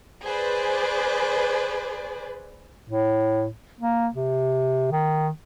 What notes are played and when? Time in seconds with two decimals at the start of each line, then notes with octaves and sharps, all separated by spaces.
0.25 G#4 B4 C5 D5
2.90 A2
3.81 A#3
4.14 C3
4.91 D#3